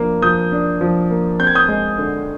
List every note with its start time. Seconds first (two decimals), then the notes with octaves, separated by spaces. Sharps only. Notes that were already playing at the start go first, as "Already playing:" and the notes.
Already playing: F3 A#3 D4
0.22 F3 D#6 G6
0.52 D4
0.81 F3
1.11 A#3
1.40 C4 G6
1.47 G#6
1.55 D#6 G6
1.68 G#3
1.98 D3